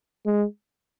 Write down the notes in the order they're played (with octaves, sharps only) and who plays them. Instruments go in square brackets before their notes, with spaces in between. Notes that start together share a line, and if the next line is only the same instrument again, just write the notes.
[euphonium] G#3